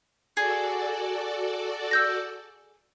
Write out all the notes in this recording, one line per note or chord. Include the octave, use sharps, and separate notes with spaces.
F#4 G#4 A4 D5
E6 G6 A#6